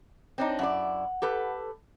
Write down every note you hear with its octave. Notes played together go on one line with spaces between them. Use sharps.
C4 D4 D#4 C#5
F#2 E4 D5 F#5
G4 A4 B4